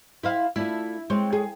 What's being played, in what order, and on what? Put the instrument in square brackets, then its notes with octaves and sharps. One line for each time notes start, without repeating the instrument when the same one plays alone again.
[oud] E4 C5 F5
[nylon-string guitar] A3 D4 F4 [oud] E4
[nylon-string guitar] G#3 C#5 [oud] C4
[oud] G#4